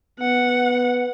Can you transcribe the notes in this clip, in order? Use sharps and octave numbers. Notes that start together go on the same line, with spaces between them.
B3 F#5